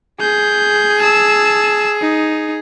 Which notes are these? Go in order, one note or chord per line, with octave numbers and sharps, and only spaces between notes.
G#4 G6
A5 E6
D#4